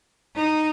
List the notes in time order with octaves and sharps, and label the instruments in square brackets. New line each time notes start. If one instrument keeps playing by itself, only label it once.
[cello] D#4